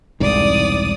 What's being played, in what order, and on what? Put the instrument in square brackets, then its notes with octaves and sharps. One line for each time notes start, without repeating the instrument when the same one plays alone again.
[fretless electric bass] E1 C2 G#2 [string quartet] D5 D#6